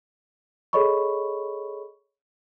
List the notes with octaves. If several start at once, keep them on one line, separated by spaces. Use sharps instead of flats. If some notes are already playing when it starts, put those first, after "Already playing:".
G#4 A4 C#5 D#5 B5 C#6